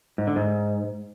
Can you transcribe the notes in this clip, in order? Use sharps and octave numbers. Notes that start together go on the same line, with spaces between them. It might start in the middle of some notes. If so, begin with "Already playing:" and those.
G#2
D3
G#2